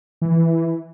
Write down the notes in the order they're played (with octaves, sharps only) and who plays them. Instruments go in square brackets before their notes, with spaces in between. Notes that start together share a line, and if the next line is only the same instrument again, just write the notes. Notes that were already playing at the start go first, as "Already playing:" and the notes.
[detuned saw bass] E3